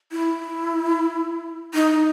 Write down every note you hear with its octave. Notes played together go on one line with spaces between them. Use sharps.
E4
D#4